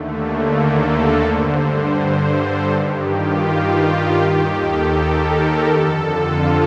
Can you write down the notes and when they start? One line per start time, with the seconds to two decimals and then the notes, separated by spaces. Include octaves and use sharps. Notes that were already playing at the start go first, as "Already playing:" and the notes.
Already playing: D#2 D3 A3
0.09 A#3
0.46 A4
1.21 G2 D3 C5
1.59 C5
2.33 A4
2.70 G2 D#3 G4
3.07 F4
4.19 D#2 D#3 G4
4.56 A4
4.94 A#4
5.68 F2 D3 A4
6.05 F4